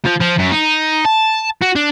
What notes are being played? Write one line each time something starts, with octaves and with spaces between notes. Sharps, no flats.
F3
F3
F#2
D#4
A5
F#4
D4